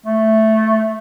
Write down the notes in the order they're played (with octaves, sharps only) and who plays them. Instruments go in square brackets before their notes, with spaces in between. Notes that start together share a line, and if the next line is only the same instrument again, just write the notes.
[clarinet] A3